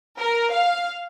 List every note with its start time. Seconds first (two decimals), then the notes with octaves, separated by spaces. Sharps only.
0.19 A#4
0.53 F5